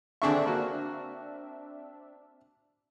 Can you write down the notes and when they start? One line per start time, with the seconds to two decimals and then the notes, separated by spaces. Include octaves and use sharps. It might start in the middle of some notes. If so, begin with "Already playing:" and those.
0.22 D3 C4 D4 G#4 E5 C#6
0.46 A#3 F#4